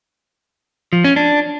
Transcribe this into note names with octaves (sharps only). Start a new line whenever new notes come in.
F3
C#4
D4